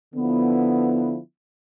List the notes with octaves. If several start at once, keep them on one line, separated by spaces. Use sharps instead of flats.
D3 F3 B3 E4